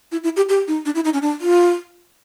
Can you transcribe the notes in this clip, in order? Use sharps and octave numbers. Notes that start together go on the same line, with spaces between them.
E4
E4
G4
G4
D#4
D4
E4
D#4
C#4
D4
F4